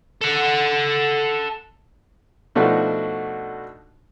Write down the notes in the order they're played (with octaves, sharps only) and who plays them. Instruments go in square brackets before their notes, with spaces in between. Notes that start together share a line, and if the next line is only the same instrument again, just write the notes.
[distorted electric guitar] A4 F#5
[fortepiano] B2 F3 A3 D4 D#4 F#4